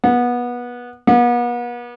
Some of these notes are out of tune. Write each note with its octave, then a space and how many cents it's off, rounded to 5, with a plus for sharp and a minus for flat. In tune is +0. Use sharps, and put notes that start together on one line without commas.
B3 -20
B3 -40